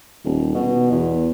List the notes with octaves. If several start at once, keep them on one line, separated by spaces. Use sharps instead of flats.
D#1
B2
E2